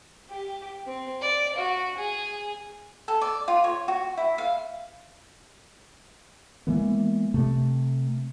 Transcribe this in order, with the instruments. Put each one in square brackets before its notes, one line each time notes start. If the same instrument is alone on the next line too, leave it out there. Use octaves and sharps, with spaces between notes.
[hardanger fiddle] G4
C4
D5
F#4
G#4
[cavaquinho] A4
D5
F4
C#5
F#4
E4
F5
[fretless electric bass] E3 G#3 A#3 B3
C3 A3